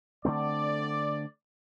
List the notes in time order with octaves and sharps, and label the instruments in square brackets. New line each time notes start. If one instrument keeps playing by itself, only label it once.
[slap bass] D3 A3 C4 [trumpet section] D5